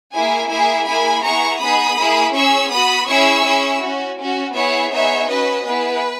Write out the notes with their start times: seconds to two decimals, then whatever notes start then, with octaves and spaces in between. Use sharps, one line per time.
0.13 A#3 E4 G#4 E5 G#5
0.50 A#3 E4 G#4 E5 G#5
0.87 A#3 E4 G#4 G#5 B5
1.24 B3 E4 G#4 A#5 C#6
1.60 B3 D#4 G#4 B5 D#6
1.97 A#3 E4 G#4
2.34 C#4 G#4 C#6 E6
2.71 B3 F#4 B5 D#6
3.08 C#4 E4 G#4 C#6 E6
3.44 C#4 E4 G#4
3.81 C#4 F#4
4.18 C#4 F#4
4.55 B3 E4 G#4 C#5 E5
4.91 B3 D#4 G#4 C#5 E5
5.28 C#4 F#4 B4 D#5
5.65 B3 E4 G#4 B4